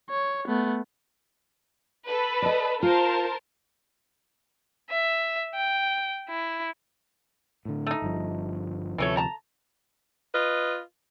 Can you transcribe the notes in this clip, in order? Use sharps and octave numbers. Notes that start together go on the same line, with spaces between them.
C#5
A3 B3
A4 B4
D5 D#5
F4 A#4 C5 A5
E5
G5
E4
A2 D3
A3 D#4
G1 G2 F3
D2 C3 E3 F3 A3 C#5
A5 A#5
F4 B4 D#5